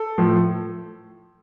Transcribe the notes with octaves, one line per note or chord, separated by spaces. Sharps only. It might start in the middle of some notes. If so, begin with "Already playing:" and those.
Already playing: A4
A2 F3